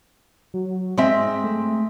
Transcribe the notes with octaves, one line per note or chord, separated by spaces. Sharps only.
F#3
G#2 G#3 C4 E5
A3